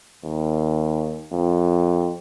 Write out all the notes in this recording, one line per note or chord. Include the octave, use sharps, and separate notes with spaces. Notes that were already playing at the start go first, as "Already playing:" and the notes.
D#2
F2